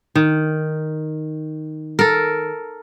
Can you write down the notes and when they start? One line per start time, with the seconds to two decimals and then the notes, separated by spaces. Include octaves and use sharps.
0.15 D#3
1.99 A4 A#4